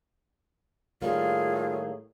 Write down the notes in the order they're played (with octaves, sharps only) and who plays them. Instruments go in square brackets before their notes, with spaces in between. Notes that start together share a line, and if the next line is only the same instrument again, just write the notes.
[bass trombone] A2 [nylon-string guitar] D#3 G3 A#3 [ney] F4 [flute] G#4